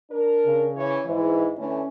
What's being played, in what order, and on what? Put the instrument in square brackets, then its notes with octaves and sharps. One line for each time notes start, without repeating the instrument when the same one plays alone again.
[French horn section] D4 A#4
[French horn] C#3
[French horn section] E3 C#4 C#5
[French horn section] G#2 [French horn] E3
[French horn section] D3 E3 A3 [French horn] C#4